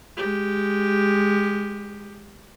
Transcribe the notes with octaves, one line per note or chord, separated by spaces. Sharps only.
G#3 G4